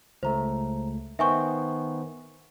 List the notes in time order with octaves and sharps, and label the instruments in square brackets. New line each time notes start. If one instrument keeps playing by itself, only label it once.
[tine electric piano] C#2 A3 [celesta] C5 A#5
[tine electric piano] D#3 B3 C5 [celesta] E5 G#5 C#6